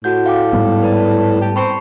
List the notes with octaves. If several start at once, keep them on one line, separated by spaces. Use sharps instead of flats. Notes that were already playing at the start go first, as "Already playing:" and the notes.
A2 F#4 F#5 G6
F5 G5 D6
G#2 G3 B3
B4 D5 A5
G4 A5
C4 B5 C#6 C7